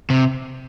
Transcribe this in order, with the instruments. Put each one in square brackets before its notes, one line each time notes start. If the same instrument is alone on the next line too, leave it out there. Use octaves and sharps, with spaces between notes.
[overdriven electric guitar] C3